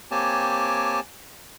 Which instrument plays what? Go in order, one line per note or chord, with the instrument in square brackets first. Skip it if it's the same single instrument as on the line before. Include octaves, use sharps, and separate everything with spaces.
[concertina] A#3 C4 G4 C#5 G#5 A5